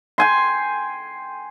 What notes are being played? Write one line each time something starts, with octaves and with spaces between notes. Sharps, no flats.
G5 G#5 C6